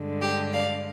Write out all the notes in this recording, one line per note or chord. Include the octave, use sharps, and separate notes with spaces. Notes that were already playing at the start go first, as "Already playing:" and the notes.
Already playing: G2 D3 G#3
G4
D5 F5